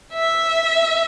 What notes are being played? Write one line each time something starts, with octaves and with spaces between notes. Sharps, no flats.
E5